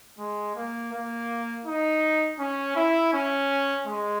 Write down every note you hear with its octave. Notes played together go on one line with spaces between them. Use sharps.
G#3
A#3
A#3
D#4
C#4
E4
C#4
G#3